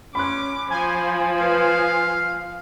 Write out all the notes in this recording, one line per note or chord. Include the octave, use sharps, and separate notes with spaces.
C#4 B5 C6 D6 F#6
F3 C5 G#5
B4 F5